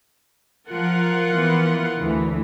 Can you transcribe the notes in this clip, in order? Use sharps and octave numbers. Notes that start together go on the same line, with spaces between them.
F3 F4 A#4 F#5
E3 B3
D2 E3